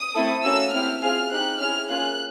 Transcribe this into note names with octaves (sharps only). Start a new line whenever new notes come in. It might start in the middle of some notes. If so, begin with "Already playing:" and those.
Already playing: D#6
A3 C4 E4 A4
A#3 C#4 F#4 A4 E6
C4 E4 G4 F6
C4 F4 G#4 F6
C4 D#4 G4 F#6
C#4 E4 G#4 F6
A#3 C#4 F4 G#4 F#6